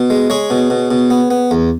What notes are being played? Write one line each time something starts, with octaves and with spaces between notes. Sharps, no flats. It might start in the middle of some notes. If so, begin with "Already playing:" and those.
Already playing: B2
G#3
G#3 G#4 C#5
B2
B2
B2
B3
B3
E2